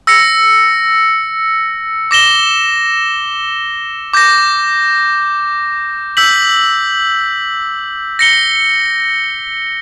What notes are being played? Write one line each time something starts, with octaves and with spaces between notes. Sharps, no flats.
E6 A#6 C#7
D6 A#6 E7 G7
D6 G6 A#6
E6 G6 B6 F#7
A#6 C#7 G7